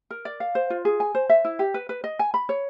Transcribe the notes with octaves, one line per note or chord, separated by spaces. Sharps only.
A#4
D5
F5
C5
F4
G#4
G#5
C5
E5
E4
G4
B4
B4
D#5
G#5
B5
C#5